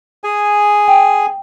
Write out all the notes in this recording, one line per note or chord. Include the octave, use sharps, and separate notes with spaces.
G#4 G#5
G5